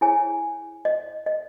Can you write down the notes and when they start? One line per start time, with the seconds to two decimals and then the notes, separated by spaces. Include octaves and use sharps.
0.01 E4 G#4 C#5 G#5
0.85 D#5
1.27 D#5